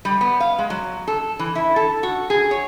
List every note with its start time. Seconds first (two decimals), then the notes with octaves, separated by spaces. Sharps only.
0.05 G3
0.21 B3
0.40 F5
0.59 G#3
0.70 F#3
1.07 A4
1.39 E3
1.55 E4
1.76 A4
2.03 F#4
2.30 G#4
2.51 C#5